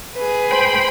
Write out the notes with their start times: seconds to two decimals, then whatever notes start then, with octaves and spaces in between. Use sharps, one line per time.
0.16 G#4 B4
0.51 C5 G5 B5